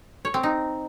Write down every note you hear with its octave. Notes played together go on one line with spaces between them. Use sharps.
C#5
C4
D#4